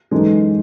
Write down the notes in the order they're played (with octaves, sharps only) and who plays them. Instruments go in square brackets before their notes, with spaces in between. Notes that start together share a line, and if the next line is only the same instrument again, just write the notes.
[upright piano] F#2 E3 G#3 D#4 A4